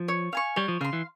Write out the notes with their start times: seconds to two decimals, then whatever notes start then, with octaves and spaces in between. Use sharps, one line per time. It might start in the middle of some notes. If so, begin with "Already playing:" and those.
Already playing: F3
0.08 C#5
0.33 F5 G#5 C#6
0.56 G3 C#5
0.68 F3
0.81 C#3 F5 C6
0.93 E3